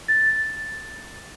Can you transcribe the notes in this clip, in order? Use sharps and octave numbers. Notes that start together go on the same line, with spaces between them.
A6